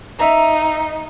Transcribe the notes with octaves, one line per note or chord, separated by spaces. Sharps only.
D#4 E5 A#5